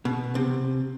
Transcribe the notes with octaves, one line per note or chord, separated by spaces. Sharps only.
B2
C3